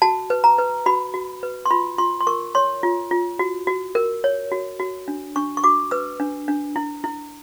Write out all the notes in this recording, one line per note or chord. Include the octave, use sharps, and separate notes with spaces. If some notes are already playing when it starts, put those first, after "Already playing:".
F#4 A5
B4
A#5
B4
F#4 B5
F#4
B4
C6
F4 B5
F4 C6
C6
A#4 C#6
C#5 C6
F4
F4
F#4
F#4
A#4
C#5
F#4
F#4
D4
D4 C#6
C#6
F#4 D6
B4 E6
D4
D4
E4
E4